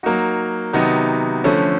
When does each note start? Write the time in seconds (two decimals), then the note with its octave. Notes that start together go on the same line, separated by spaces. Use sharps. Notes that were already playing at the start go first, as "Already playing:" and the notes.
0.03 F#3 A#3 D#4 F#4
0.73 C3 D#3 F#3 B3 D#4
1.44 D3 F3 A3 C#4